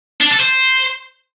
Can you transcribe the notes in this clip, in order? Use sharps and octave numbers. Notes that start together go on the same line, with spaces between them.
D4
A4
C5